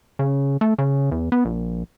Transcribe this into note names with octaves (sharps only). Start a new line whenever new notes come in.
C#3
A3
C#3
E2
B3
A#1